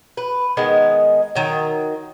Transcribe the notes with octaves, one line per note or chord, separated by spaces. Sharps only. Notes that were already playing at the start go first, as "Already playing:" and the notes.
B4
D#3 G#3 B3
D#3 F#3